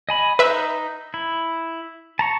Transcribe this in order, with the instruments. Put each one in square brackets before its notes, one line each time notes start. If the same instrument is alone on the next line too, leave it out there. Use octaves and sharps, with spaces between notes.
[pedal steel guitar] D#5 G#5 B5
[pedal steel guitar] D#4 [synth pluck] B4 E5
[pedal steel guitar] E4
A5 A#5 C#6